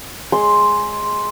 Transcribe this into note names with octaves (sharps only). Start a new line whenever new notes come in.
G#3 C6